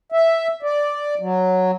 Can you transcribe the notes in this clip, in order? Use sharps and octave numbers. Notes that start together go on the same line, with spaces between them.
E5
D5
F#3